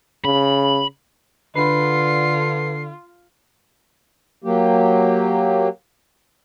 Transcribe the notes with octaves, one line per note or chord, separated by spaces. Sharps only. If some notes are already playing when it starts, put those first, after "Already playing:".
C#3 B5
D3 F4 B4 C7
F#3 A#3 G4